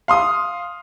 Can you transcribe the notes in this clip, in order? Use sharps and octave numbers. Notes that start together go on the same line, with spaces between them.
F5 C6 D#6